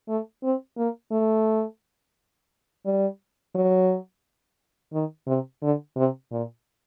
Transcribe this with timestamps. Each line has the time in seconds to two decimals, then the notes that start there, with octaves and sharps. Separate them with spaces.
0.08 A3
0.43 C4
0.77 A#3
1.12 A3
2.85 G3
3.55 F#3
4.93 D#3
5.27 C3
5.62 D3
5.96 C3
6.32 A#2